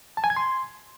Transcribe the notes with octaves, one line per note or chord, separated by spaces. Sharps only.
A5
G#5
G#6
C6